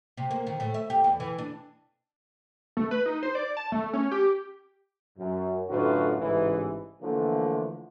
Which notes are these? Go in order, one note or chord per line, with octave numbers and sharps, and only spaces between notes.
C3
A#3
D#3
A2
E5
G4
E2
E3
D4
A3
B4
D#4
C5
D5
A5
A3
C#4
G4
F#2
F#2 A2 D3 F4 F#4 B4
A1 G#2 C#3 E3
D3 E3 F3 A3 A#3